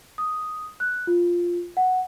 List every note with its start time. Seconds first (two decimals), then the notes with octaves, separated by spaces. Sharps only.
0.18 D#6
0.80 F#6
1.07 F4
1.77 F#5